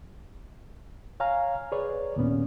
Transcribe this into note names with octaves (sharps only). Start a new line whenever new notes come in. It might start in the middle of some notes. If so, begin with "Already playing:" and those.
C#5 F5 G#5 A#5 F6
G#4 B4 C#5 D5
D#2 A#2 B3 C#4